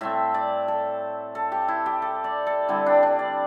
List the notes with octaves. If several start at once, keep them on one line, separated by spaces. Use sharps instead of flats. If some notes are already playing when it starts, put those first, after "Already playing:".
A2 A3 C4 E5
D5
A4
A4
G4
E4
G4
A4
D5
A4
D3 G3 C4 E4
D4
D4
D5